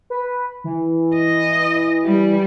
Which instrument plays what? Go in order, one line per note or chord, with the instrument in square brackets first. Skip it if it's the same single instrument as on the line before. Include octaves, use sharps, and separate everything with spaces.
[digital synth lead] B4
E3
[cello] D#5
G3